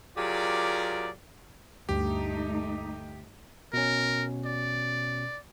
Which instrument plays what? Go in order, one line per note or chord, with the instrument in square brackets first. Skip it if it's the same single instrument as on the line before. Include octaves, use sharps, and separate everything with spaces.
[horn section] F#3 F4 G4 G#4 A#4 D5
[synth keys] D2 [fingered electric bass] G2 [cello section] A3 D#4 [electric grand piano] G4
[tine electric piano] B2 C#4 [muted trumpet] A#4
[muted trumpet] D5